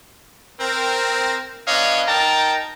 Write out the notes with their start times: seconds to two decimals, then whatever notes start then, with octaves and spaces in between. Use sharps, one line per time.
0.60 C4 A#4
1.67 B3 D4 C#5 D#5 F5
2.08 D#4 A#4 G5 A5 A#5